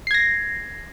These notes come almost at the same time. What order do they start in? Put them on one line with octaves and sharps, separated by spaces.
C7 G#6 A#6